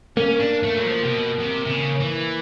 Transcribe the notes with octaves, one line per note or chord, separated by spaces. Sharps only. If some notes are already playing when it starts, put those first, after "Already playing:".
A#3 C#4
D4
A3
F#3
F3
C3
B2
C3
C3
C#3
E3